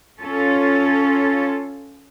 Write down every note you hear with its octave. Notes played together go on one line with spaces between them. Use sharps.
C#4 F4 A4